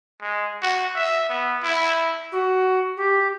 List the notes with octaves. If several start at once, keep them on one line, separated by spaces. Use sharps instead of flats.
G#3
F#4
E5
B3
E4
F#4
G4